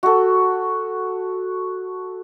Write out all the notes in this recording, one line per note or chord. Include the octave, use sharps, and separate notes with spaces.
F#4 A4